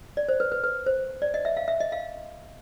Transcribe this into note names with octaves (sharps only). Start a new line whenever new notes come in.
D5
C5
B4
B4
B4
C5
D5
D#5
E5
F5
E5
D#5
F5